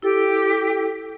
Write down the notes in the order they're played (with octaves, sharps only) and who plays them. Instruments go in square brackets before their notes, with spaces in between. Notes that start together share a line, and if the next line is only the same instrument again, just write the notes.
[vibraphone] E4 A4 E6 [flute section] G4